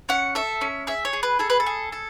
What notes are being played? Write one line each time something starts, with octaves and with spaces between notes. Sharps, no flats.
C#4 F#5
A4 E5
C#4
G#4 E5
C#5
G#4
B4
G#4 A4
B4
A4
G#4
A4